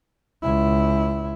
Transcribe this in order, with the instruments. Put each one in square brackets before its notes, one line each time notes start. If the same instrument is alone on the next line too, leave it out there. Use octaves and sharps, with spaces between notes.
[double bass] C#2 E4